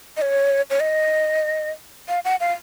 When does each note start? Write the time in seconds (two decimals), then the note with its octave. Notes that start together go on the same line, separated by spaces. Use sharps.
0.17 D#5
0.22 C#5
0.70 C#5
0.80 D#5
2.08 F5
2.25 F#5
2.40 F5